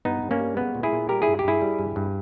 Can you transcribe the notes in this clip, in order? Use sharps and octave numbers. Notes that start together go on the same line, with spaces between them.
G2 B3 D#4
G2
A#3 C#4
G3
G#3 B3
A#2
E4 G#4
A#2
G3 G4 A#4
G2 E4 G#4
G4
G2 E4 G#4
G3
G2
G2